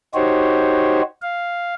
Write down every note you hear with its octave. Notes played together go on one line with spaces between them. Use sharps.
D#4 F#4 G4 C5 C#5
F5